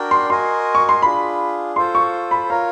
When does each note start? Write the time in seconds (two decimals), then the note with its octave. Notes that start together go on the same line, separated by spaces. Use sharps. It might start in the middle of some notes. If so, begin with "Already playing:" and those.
Already playing: D4 F#4 A#4 D5 G5
0.11 C6
0.30 F#4 A#4 D#5 G#5 C6
0.75 C#6
0.89 C6
1.02 D4 F4 G#4 B5
1.76 F4 A4 C5 C6
1.95 C#6
2.31 B5
2.49 F4 A#4 C#5 F5 A#5